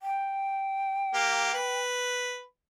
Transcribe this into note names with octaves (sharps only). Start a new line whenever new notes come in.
G5
A#3 G4
B4